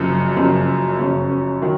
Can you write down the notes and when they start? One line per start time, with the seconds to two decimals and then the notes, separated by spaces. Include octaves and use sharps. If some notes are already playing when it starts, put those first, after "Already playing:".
Already playing: F#1 F#2 F3
0.37 F#1 F#2 F3
0.98 F#1 F#2 F3 C#4
1.30 C#4
1.62 D#3 F#3